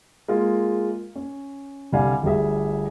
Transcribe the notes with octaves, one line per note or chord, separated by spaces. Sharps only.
G#3 A#3 F4
C#4
C2 D3 G3 F5 G#5
G1 D2 G3 G#4 E5